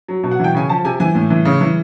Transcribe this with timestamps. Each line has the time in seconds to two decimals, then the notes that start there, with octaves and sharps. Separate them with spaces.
0.08 F#3
0.23 B2
0.31 F#5
0.40 E3 G5
0.55 C#3 G#5
0.69 F3 A5
0.85 C3 G#5
1.00 E3 G#5
1.15 A2
1.30 E3
1.45 C#3
1.61 E3